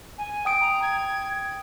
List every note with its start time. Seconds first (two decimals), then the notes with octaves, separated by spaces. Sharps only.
0.18 G#5
0.45 G5 D#6 D7
0.61 A#5
0.82 G#6